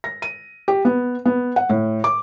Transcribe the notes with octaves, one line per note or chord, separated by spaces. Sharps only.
A#6
D#7
G4
B3
B3
F#5
A2
D6